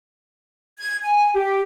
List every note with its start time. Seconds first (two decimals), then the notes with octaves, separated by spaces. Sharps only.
0.79 G#6
1.02 G#5
1.33 G4